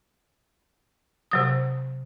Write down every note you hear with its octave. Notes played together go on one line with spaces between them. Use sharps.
C3 F#3 D#6